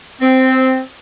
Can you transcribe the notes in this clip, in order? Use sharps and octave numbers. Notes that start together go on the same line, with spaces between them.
C4